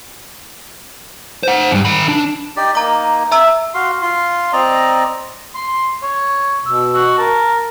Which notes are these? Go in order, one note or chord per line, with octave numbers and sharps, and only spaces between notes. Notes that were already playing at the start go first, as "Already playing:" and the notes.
C5 F#5
E2 G2
D#3 B5
D4
D#4 G4 D5
A#3 D#4 A#5 D6
E5 A#5 E6
F#4 F5 C6
F4 C6
C4 D5 D#5 A#5
C6
C#5
B2 E6
F#4
A#4 A5